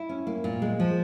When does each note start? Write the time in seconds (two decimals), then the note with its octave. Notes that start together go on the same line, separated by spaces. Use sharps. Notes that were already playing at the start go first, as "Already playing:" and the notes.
Already playing: E4
0.09 C#4
0.27 A#3
0.44 A#2
0.62 G#3
0.80 F3